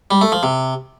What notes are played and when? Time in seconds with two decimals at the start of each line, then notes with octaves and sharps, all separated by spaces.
0.11 G3
0.21 A3
0.32 F3
0.43 C3